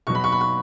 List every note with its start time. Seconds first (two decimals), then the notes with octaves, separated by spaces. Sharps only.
0.07 B2 F#3 C#6
0.15 B5
0.24 C#6
0.32 B5
0.41 C#6